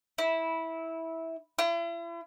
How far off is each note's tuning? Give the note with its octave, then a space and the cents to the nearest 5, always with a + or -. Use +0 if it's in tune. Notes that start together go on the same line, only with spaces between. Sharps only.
E4 -15
E4 +40